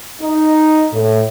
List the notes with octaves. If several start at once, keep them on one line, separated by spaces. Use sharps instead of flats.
D#4
A2